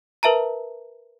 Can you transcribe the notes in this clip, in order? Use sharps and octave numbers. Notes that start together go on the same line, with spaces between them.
A#4 B4 E5 A5 A#5